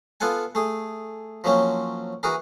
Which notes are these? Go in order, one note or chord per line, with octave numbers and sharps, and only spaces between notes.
B3 F4 A4 F#5 G#5
A3 G#4
F3 F#3 A#3 C4 C#4
E3 F#4 G#4 A#4